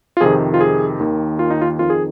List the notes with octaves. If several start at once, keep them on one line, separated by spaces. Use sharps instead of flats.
F4
F2 C3 D#3 G#4
F4
G#4
D#2 D#3
F4
D#4
F4
F2 D#3 F4
G#4